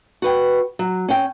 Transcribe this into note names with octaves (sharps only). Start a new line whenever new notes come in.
F#4 B4 G5
F#3
C#4 G5